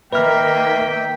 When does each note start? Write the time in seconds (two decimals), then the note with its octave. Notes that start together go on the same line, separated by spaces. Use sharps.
0.13 D#3 A#3 B4 E5 G5 F6